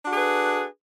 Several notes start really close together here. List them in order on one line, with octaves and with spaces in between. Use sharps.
D4 F#4 A4 G#4 B4